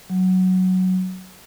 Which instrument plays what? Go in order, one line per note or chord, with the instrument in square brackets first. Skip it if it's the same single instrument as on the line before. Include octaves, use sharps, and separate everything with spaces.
[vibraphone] F#3